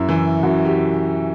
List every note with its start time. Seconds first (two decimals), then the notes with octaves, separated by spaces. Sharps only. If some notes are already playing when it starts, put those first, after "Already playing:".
Already playing: F#2 E4
0.09 E3
0.43 F#2 F#4
0.65 G4